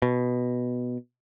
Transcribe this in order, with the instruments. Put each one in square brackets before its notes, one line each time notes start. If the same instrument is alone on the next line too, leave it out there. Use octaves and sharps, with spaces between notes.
[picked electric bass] B2